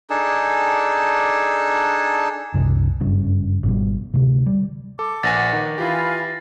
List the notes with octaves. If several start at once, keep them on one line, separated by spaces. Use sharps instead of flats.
D4 D#4 G#4 A4
F#1 C2
F#1 G2 C#3
G#1 B2 G3
D1 D2 C3
G3
A4 D6
A#1 B4 F#5 G#5 A6 A#6
D#3
E3 F4 G4 F5 G#5 B5